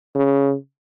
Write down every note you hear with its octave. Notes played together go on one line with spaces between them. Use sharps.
C#3